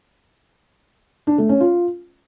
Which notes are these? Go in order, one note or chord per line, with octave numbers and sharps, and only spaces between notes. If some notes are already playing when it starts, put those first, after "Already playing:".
D4
A3
C#4
F4